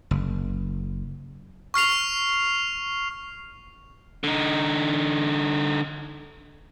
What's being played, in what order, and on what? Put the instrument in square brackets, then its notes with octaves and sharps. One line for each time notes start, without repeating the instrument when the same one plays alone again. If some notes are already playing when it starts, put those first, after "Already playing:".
[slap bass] F#1
[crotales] C#6 F6 C7 F7
[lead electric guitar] D3 D#4